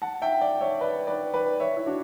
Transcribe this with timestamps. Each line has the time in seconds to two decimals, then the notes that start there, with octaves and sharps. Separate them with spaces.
0.02 F#5 A5
0.22 E5 G5
0.41 D5 F#5
0.61 C#5 E5
0.81 B4 D5
1.07 B4 D5
1.34 B4 D5
1.60 C#5 E5
1.77 E4
1.86 D4 F#4